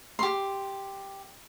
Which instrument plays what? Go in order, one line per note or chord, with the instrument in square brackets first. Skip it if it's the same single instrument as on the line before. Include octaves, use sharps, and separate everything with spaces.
[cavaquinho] G4 C6